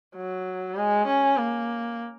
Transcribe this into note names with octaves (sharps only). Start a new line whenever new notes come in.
F#3
G#3
C#4
A#3